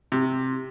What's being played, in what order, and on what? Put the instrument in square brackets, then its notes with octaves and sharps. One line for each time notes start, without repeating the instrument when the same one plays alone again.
[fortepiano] C3